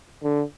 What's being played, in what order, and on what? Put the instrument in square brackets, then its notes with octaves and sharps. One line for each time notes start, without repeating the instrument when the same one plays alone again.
[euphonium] D3